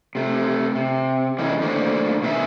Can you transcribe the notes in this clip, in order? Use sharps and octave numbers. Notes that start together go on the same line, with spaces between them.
C3 A3
C3
D3 E3 G#3 C#4 D#4
D#3 A3 A#3 D4 C5 C#5
B2 D#3 G#4 A#4 E5